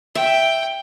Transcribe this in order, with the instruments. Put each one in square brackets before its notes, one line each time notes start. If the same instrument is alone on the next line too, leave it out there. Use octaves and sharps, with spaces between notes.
[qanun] E5 [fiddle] G5